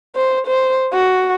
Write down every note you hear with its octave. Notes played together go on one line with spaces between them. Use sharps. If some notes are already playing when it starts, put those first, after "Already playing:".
C5
C5
F#4